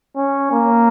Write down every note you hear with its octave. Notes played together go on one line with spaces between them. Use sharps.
C#4
A#3